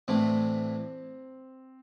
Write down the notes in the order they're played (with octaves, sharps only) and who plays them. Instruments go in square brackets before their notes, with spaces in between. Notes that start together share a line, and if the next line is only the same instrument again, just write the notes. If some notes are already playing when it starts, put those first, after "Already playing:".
[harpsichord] A2 E3 A3 D4 [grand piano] C4